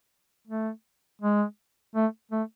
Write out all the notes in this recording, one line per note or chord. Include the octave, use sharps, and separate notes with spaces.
A3
G#3
A3
A3